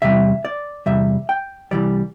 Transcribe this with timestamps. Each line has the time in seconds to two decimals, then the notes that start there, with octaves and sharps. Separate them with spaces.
0.02 E2 C3 G3 E5
0.45 D5
0.86 E2 C3 G3 E5
1.29 G5
1.71 C2 C3 E3 G3 D5